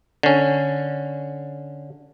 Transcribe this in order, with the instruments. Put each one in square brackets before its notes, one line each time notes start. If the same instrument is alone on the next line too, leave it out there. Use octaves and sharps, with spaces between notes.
[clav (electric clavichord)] D3 C#4